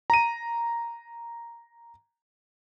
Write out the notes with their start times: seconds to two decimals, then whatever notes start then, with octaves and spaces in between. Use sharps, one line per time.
0.10 A#5 D#7